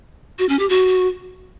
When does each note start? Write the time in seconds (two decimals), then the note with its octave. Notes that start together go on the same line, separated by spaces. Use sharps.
0.39 F#4
0.49 C#4
0.59 G4
0.69 F#4